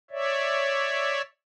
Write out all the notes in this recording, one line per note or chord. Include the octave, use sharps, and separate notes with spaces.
C#5 D5 E5